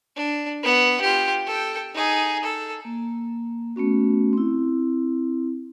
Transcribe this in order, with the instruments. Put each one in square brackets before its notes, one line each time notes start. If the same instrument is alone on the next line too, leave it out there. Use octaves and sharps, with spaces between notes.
[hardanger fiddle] D4
B3 F#5
F4 G4
A4 G5
D#4 G#4
A4
[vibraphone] A#3
A3 B3 C#4 F#4
C4 E4